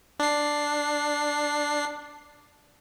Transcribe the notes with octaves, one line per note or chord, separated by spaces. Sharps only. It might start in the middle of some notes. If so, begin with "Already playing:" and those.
D4 C7